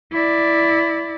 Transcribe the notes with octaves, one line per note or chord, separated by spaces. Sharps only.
E4 D5